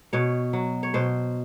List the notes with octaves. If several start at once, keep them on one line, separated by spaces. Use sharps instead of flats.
B2 C#5
F#3
C#5
B2 C5